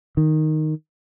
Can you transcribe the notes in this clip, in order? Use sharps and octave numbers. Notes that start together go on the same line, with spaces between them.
D#3